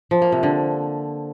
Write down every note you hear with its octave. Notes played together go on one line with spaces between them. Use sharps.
F3
A#3
C3
D3